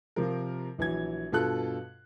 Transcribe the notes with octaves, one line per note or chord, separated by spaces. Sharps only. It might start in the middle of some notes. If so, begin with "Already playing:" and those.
C3 F3 A#4
A#1 E3 F#3 G#6
G2 B2 F4 A4 F#6